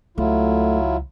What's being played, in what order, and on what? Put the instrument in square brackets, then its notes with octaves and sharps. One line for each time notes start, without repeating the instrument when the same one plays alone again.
[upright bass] C#2 [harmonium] F#3 E4 F4 [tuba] A3